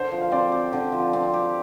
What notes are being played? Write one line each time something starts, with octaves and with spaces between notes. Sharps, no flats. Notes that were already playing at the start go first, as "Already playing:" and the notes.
Already playing: D3 C5
F3
F5
C4 D5
G4
D3
F3
C4
G4